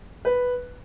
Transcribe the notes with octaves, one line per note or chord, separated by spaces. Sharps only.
B4